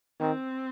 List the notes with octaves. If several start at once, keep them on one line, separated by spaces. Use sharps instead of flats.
D#3 C4